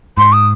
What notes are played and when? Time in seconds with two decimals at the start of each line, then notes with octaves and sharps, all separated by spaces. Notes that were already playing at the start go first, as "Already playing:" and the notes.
0.17 G#2 C6
0.33 D#6